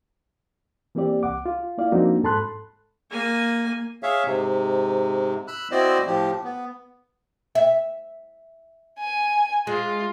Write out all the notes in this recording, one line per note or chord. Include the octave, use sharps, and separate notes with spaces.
E3 A#3 C4 G4 D5
C2 F#5 D6
F4
A#3 E4 D5 F5
F3 A#3 C4 D4 D#4 F#4
G#2 A4 A5 B5 C6 F#6
A#3 G#5
G#4 C#5 E5 F5
G#2 C3
B5 E6 F#6
C4 E4 F#4 C5 D5 D#5
A2 F3 G4
B3
E5
G#5
G#3 F4